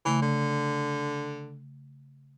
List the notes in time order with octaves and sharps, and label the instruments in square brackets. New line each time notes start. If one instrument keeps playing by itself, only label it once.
[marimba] C#3 A3 [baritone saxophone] E3
[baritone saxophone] D3